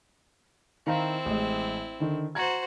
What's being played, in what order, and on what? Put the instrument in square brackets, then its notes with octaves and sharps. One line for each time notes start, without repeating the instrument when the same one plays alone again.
[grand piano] D#3 F5 A#5 [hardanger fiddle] C4 E4
[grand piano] A1 G#3
D3 D#3
[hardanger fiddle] F#4 C5 [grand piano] A#5 G#6